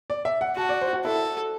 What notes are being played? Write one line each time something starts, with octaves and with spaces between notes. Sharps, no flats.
D5
E5
F#5
F#4 A5
D5
C5
F#4
E4 A4